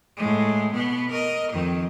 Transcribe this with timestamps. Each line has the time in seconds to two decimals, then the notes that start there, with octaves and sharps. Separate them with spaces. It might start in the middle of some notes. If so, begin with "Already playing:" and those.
0.17 A2 G#3
0.74 B2 B3
1.11 A#4 D#5
1.52 F2 D#3